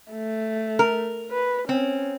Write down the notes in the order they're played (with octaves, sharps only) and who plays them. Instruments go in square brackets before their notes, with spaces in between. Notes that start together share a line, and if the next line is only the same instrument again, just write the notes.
[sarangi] A3
[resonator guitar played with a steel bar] A#4
[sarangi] B4
[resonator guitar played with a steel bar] C4 [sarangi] C#4